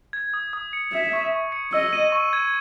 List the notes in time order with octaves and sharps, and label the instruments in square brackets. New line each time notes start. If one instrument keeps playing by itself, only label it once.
[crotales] G#6
D#6
D#6
C#7
[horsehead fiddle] E5 [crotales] G#6
[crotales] C#6
C#6
C#7
[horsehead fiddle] D#5 [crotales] E6
[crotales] D#7
C#6
G#6